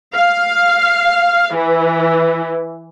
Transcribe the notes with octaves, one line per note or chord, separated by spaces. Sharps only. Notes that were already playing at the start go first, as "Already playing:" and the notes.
F5
E3